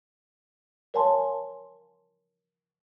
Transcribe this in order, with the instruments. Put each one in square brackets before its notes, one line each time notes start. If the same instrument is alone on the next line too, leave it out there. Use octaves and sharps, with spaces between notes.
[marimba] A#4 C#5 F5 G#5 A5 C6